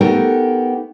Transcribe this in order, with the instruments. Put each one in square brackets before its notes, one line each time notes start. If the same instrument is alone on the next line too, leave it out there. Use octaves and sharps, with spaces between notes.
[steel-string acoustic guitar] A3 B3 D#4 G4 A4 A#4